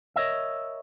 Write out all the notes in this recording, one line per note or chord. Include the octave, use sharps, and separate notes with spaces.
A#4 C#5 D#5 E5